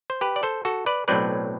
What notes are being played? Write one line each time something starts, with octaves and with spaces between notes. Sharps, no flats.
C5
G4 B4
D5
A4 C5
F#4 A4
B4 D5
B1 A2 F#3 C4 B4 D5